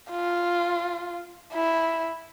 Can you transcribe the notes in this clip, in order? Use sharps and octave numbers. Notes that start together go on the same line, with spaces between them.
F4
E4